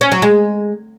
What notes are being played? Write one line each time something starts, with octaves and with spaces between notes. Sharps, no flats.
C#4
F#3
G#3